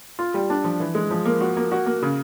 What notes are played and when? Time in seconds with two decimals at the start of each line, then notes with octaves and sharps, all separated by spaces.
0.19 F4
0.34 G3
0.50 D4
0.64 F3
0.80 E3
0.95 G#3
1.11 F3
1.25 A#3
1.41 F#4
1.57 A#3
1.72 F#4
1.86 A#3
2.02 C#3